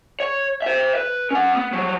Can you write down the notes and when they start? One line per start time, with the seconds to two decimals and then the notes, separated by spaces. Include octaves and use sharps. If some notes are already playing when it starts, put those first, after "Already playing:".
0.20 C#5
0.62 C5 E5
0.95 B4
1.31 C#4 F#5
1.56 B3
1.73 F3 F#3